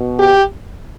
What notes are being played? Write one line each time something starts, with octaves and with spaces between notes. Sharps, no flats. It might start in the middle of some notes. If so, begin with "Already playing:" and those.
Already playing: B2
G4